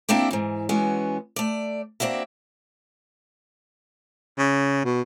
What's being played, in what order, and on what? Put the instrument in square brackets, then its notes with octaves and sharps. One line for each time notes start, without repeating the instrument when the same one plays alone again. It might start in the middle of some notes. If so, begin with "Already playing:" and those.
[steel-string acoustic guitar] A#3 C4 D4 E4 G4
G#2 E3
E3 G#3 B3 C#4 F#4
A3 D5
A#3 C4 D4 F#4 E5
[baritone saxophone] C#3
B2